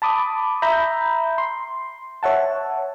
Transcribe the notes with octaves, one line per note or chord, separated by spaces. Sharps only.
A5 B5 D6 D#6
E5 A#5 B5 G6
C6
C#5 E5 F#5 A5